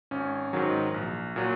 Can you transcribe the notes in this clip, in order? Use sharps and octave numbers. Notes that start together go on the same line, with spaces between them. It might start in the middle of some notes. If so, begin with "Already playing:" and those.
G#1 C#4
G#2 D#3 F#3
A#1
A#2 F#3